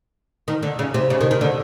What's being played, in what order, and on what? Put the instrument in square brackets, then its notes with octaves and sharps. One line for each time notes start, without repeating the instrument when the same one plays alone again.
[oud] D#3
D3
C#3
C3
C#3
D#3
D#3
D3